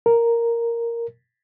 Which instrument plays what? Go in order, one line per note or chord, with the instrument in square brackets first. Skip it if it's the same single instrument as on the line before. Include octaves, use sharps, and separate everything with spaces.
[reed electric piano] A#4